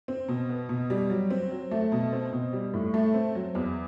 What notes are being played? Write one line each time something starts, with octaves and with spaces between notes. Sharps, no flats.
C4
B2
B3
B2
G3
F#3
C4
F#3
A3
B2
C4
B2
G3
A2
A3
C4
F#3
E2